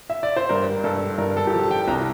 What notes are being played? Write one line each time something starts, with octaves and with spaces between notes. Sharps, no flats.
E5
D5
C5
G2 A#4
G2 A4
G2 A#4
A4
G4
F3 A4
A5
G5
C2 A#5